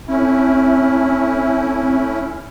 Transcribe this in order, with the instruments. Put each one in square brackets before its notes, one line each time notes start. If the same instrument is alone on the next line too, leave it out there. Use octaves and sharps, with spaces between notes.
[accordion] A3 C#4 E4 [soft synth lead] C4